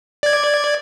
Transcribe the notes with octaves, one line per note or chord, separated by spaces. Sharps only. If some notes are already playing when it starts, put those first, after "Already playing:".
D5 G#6